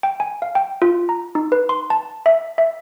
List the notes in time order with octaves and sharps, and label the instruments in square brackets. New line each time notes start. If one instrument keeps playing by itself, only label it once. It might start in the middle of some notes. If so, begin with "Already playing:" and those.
[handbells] G5
G#5
F5
G5
F4
A#5
D#4
B4
C6
A5
E5
E5